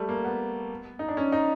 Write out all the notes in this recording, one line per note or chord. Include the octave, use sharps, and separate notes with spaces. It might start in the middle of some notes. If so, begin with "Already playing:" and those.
Already playing: G3 A3
A#3
B3
D#4
D4
C#4
D#4